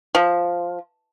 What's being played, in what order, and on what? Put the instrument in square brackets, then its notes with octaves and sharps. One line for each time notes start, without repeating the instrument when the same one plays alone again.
[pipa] F3